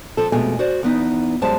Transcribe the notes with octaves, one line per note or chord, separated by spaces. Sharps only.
F2 F3 A4
F2 B2 G#3 A3 G#5
F#4 C5 D5
E2 B3 D#4
F#2 G3 G#3 C5 A5